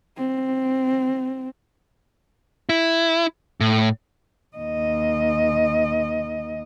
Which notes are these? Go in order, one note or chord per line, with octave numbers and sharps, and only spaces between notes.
C4
E4
A2
D#2 D#5